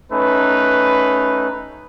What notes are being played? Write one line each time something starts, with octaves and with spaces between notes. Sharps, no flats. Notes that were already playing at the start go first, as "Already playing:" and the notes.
A3 C#4 D#4 B4